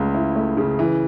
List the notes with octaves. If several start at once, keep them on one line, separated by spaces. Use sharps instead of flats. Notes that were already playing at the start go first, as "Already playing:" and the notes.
Already playing: C#2 C#3 A3
E4
A3
C#3
E3